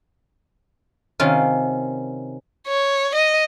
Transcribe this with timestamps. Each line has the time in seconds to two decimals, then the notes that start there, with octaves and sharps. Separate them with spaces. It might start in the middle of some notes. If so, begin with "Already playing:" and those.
1.20 C3 D#3 C#4 F4
2.68 C#5
3.15 D#5